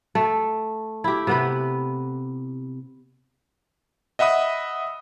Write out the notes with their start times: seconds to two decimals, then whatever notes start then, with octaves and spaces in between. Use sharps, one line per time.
0.15 A3
1.04 E4 G4
1.27 C3 B3 B4
4.19 D#5 E5 F#5 B5 D#6